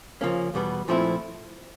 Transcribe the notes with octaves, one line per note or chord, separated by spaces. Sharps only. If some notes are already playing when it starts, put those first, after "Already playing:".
C#3 F3 A#3 C#4
E2 B2 G3 B3
A#2 F3 A3 C4 E4